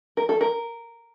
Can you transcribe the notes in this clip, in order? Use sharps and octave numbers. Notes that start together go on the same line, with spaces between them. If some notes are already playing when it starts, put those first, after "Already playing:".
A#4
A4
A#4